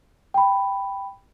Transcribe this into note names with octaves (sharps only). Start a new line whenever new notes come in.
G5 B5